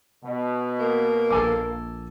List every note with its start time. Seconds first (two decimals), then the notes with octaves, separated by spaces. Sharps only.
0.24 B2
0.79 A#3
1.30 A#1 A4 G#5 D6